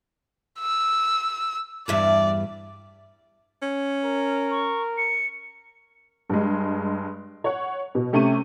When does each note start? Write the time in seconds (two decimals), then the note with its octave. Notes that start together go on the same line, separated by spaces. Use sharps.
0.59 E6
1.88 E2 G2 D5 E5
3.62 C#4
4.05 A#4
4.51 C#6
4.98 C#7
6.30 G2 G#3
7.44 C#5 F#5
7.95 B2
8.13 C3 A3 C#4 C#6 D#7